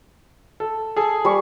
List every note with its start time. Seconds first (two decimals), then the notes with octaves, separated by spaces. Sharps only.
0.60 A4
0.96 G#4 A4
1.25 G3 C#6